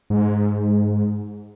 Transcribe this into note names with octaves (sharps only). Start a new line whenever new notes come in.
G#2